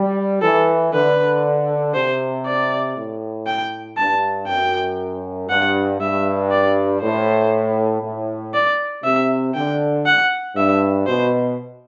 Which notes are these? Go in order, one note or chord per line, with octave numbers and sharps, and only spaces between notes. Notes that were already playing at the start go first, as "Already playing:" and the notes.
Already playing: G3
E3 A4
D3 B4
C3 C5
D5
A2
G5
G2 A5
F#2 G5
G2 F#5
G2 E5
D5
A2 C5
A2
D5
C3 E5
D3 G5
F#5
G2 E5
B2 C5